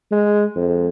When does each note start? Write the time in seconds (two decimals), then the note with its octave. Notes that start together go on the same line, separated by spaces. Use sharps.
0.12 G#3
0.56 F2